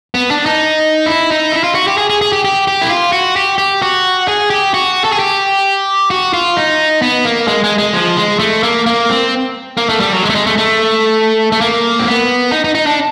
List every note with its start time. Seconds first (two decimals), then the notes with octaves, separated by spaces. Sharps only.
0.14 B3
0.31 D4
0.46 D#4
1.06 E4
1.30 D#4
1.52 E4
1.64 F4
1.75 F#4
1.87 G4
1.98 G#4
2.10 G#4
2.21 G#4
2.33 G4
2.45 G4
2.67 G4
2.81 E4
2.89 F4
3.12 F#4
3.36 G4
3.58 G4
3.82 F#4
4.28 G#4
4.50 G4
4.74 F#4
5.04 A4
5.12 G#4
5.19 G4
6.10 F#4
6.33 F4
6.57 D#4
7.02 B3
7.25 A#3
7.48 G#3
7.64 G#3
7.78 G#3
7.93 F3
8.17 G#3
8.39 A3
8.63 A#3
8.86 A#3
9.09 C4
9.77 A#3
9.89 A3
10.00 G3
10.12 F#3
10.23 G#3
10.29 A3
10.35 G#3
10.46 A3
10.58 A3
11.52 A3
11.61 A#3
11.99 C4
12.07 B3
12.52 D#4
12.64 D#4
12.75 D#4
12.86 D4